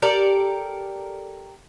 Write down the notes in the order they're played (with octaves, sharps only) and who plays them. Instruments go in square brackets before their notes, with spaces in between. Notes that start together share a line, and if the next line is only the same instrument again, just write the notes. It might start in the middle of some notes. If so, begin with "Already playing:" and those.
[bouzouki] G4 A4 A#4 D5